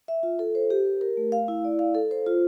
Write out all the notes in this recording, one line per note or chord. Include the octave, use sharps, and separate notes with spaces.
E5
F4
A4
C5
G4
A#4
A#4
A3
F5
E4
D5
F5
A4
C5
F4